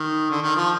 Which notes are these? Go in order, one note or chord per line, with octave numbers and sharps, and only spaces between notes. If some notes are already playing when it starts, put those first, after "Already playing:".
Already playing: D#3
D3
D#3
F3